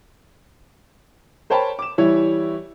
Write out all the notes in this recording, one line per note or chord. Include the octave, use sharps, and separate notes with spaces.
A#4 C5 C#5 G5 A5 B5
D6 E7
E3 G3 E4 C#5